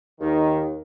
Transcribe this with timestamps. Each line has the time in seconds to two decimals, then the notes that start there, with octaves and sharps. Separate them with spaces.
0.20 D#2 D#3